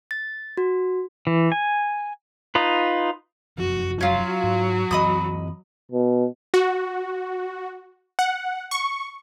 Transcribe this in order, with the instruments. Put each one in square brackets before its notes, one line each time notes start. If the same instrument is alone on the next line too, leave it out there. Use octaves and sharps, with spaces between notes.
[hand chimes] A6
F#4
[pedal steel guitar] E3
G#5
D#4 F4 B4
[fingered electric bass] F1 F#2 F3 [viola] F#4
[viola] F#3 F#4 [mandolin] C#4 F4
[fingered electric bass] G#2
[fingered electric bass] F#2 E3 C4 [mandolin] D#5 B5 D#6
[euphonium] B2
[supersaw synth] F#4
F#5
C#6